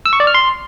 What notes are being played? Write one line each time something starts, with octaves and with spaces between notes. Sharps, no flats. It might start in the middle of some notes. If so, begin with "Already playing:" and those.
E6
C#6
D5
F6
C6